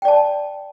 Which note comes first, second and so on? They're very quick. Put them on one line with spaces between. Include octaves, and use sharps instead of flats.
G5 D5 A5